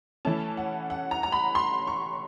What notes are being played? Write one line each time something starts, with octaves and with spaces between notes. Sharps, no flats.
E3 A3 C#4 A5
F#5
F#5
A#5
A#5
B5
C6
C#6